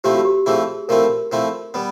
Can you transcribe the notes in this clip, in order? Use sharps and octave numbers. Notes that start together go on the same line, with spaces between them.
F3 A3 C4 E4 G4
F#4
G4
F3 A3 C4 E4 G#4
F3 A3 C4 E4 A#4
F3 A3 C4 E4
G3 B3 B4